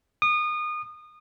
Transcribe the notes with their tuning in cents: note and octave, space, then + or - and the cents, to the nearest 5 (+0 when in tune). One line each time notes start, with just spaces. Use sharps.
D#6 -30